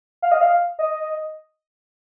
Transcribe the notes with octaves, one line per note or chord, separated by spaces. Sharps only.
F5
D#5
F5
D#5